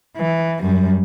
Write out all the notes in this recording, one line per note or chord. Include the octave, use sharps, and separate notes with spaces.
E3
F#2 G3